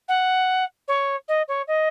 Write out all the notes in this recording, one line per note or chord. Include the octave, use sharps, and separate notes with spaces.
F#5
C#5
D#5
C#5
D#5